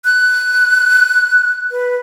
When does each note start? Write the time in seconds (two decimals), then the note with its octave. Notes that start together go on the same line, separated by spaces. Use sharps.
0.05 F#6
1.71 B4